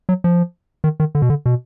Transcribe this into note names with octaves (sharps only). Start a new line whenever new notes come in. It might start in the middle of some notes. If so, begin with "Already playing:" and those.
F#3
F3
D#3
D#3
D3
B2
D3
B2